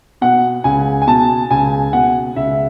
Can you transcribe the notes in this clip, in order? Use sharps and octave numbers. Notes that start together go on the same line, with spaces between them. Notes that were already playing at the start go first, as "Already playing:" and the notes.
B2 F#5
C#2 G#5
G#5
B2 A5
C#2 G#5
B2 F#5
C#2 E5